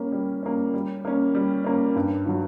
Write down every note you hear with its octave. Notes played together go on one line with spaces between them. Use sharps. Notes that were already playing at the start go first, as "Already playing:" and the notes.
Already playing: G3 A#3 C#4
G3
A#3 C#4
G3
A#3 C#4
G3
A#3 C#4
G2
D#3 F#3